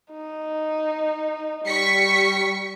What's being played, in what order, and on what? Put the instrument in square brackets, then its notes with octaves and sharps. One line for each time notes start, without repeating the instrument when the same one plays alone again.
[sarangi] D#4
[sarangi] G3 [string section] C#6 B6 C#7